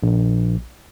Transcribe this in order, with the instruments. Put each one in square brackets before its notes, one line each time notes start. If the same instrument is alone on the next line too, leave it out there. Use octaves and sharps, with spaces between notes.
[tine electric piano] A#1